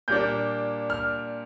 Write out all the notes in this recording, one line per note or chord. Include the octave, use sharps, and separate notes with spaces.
A#2 G3 A#3 D4 G6
F6